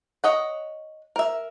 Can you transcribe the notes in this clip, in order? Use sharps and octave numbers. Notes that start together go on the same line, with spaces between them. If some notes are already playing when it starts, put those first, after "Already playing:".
C#5 D#5 F#5
A#4 E5